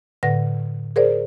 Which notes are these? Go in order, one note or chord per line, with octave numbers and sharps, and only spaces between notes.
A2 D3 B4 F#5 A#6
G#4 A#4 C5 D5